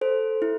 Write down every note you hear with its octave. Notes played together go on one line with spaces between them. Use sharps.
A4 C5
E4